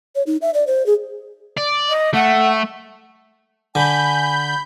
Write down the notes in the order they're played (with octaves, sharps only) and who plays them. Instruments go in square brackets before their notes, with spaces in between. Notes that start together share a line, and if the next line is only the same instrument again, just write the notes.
[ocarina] C#5
D#4
E5
D5
C5
G#4
[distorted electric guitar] D5
[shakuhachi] D#5
[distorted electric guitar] A3 [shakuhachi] F#5
[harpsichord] D3 [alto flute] G#5 [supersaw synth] B5 G6